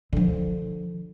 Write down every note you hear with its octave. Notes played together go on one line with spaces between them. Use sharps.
D3 F3